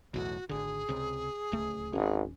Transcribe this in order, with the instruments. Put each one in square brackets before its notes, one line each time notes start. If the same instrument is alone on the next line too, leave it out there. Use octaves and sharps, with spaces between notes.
[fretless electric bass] B1 E2 A2 [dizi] F#4
[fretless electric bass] G#1 D3 [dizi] G#4
[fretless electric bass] C#2 C3
D1 C#2 A3
[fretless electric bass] D1 C#4 [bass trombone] G#1